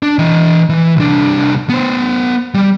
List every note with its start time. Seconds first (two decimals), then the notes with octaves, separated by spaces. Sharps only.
0.03 D4
0.19 E3 D#5
0.69 E3
0.97 C2 D4
1.69 B3 C5
2.54 G3